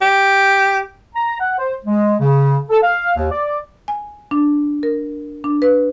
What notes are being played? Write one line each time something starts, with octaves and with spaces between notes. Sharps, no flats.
G4
A#5
F#5
C5
G#3
C#3
A4
F5
D#2
D5
G#5
D4
A#4
D4
B4